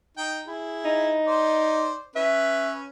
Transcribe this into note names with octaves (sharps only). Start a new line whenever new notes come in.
D#4 G5
E4 G#4
D#4
C5 D5
C#4 B4 E5